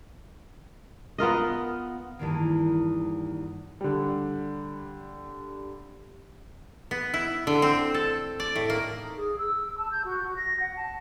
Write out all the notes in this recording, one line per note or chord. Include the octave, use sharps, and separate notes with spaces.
B3 F4 A#4 D#5
E2 G2 D#3 A#3
D3 G3
B3
E4
D3
C4
A4
D5
A2
A#3
D#4
G#4
E6
A5
G6
F#4
F#4
A#6
F#5
A5